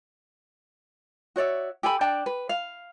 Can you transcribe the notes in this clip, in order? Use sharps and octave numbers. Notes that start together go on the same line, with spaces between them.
F#4 C#5 D5 E5
G4 A4 G#5 B5
D4 D5 G5 A5
B4
F5